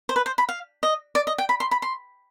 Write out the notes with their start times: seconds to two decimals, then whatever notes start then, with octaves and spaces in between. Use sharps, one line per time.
0.09 C5
0.16 B4
0.26 C5
0.38 B5
0.49 F5
0.83 D#5
1.15 D5
1.27 D#5
1.38 G5
1.49 B5
1.60 C6
1.71 B5
1.82 C6